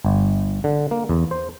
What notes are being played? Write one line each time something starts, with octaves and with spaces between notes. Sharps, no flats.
G1
D3
A#3
E2
C5